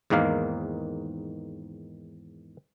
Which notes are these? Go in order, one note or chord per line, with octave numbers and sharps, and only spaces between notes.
E2 G#2 D#3 A#3 F5